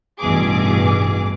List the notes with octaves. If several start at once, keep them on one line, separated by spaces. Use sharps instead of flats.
A1 G2 B2 E3 G#4 D6